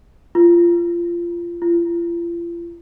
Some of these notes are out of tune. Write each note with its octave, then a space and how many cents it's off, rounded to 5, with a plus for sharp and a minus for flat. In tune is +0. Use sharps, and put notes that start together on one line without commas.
F4 -20
F4 -40